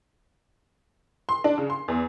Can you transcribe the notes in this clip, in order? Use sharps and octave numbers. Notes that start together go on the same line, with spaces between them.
C6
D4
C#3
C6
E2